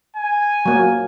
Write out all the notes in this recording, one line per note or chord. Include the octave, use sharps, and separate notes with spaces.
G#5
F#3 A#3